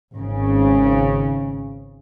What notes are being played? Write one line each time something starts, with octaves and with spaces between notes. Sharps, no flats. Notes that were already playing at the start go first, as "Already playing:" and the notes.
G#1 C#3